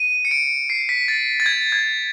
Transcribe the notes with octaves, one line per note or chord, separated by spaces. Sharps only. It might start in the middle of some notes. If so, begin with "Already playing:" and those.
Already playing: D#7
C#7
D7
C7
B6
A6
A6
G#6
G#6